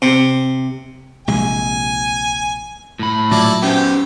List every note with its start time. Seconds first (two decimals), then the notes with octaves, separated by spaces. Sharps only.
0.02 C3
1.28 A#1 C3 G#3 G#5
2.99 A2 B5
3.31 A#2 F#3 E4 D5 A5
3.63 B3 C#4 G4 C5